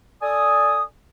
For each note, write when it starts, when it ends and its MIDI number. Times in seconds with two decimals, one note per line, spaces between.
0.22 0.83 69
0.22 0.83 74
0.22 0.83 80
0.22 0.83 87